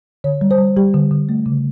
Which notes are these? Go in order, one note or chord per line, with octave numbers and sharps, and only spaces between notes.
D3 C#5
G3
C5
G3
G3 G4
D3
D3
A3
C#3